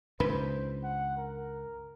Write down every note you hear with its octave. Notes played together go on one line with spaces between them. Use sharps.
C#2 G2 D#3 B4 C5
F#5
A#4